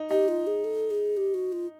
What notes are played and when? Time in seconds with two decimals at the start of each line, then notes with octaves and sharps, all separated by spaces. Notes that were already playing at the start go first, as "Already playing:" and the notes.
Already playing: D#4
0.10 D#4 G4
0.28 F4
0.47 G#4
0.64 A4
0.91 G#4
1.17 G4
1.34 F#4
1.52 F4